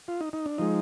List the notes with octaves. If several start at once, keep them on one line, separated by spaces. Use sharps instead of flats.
F4
D#4
D#4
D4
F3 G#3 D#4